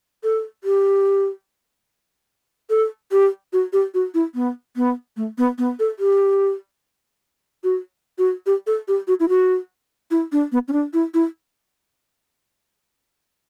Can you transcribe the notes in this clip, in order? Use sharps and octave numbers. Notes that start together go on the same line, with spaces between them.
A4
G4
A4
G4
F#4
G4
F#4
E4
B3
B3
A3
B3
B3
A4
G4
F#4
F#4
G4
A4
G4
F#4
E4
F#4
E4
D4
B3
C#4
D4
E4
E4